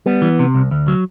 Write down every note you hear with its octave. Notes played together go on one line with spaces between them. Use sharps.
G3 B3
E3
C3
C2
D2
F#3